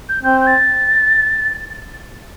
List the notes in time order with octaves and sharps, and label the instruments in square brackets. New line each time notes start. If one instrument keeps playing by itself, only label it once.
[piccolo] G6
[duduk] C4 [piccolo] G6
[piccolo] G6
A6